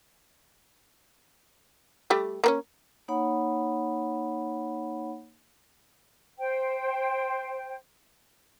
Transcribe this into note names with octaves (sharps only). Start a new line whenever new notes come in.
G3 A3 G4
A#3 B3 C#4
A#3 D#4 C#5 F#5 B5
C5 G5